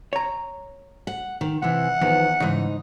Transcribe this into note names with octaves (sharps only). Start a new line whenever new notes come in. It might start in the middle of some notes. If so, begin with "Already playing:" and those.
C#5 A#5
F#5
D#3
C3 E3 F#5
E2 D#3 F3 B3
G#2 C#3 E3 D#4